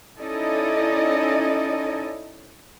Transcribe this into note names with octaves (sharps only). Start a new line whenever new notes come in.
C#4 D#4 E4 A4 D5 D#5